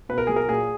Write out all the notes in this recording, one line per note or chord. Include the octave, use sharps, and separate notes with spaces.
B2 B4
A#4
F#3 G#4
A#4
A#2 G#4